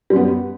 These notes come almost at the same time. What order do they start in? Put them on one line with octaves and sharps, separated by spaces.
G3 F#2 B3